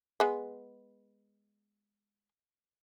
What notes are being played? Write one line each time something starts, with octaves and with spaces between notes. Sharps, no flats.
G#3 B3